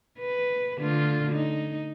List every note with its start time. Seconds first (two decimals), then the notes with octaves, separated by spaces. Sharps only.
0.19 B4
0.78 D3 A3 F4
1.32 D#4